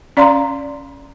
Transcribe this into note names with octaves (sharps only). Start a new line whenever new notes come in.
C#4 D5 F5 A#5 C6